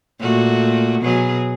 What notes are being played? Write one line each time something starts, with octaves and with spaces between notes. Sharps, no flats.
A#2 A3 F#4
B2 F#3 G#4